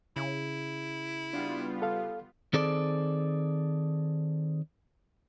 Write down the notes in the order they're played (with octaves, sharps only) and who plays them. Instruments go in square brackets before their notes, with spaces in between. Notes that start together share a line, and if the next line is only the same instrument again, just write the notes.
[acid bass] C#3 [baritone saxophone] E4
[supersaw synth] G3 B3 F4 [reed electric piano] D4
[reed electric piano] A4 F5
[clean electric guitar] D#3 C4 G#4 A4 D5